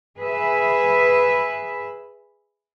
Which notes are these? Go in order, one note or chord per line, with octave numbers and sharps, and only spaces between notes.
G#4 B4 E5